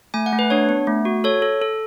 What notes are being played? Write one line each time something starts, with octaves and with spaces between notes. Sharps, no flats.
A3 G#5
F#5
A3
B4
D4 C#5
B3
A3
F#4
A4 C#5
A4
A4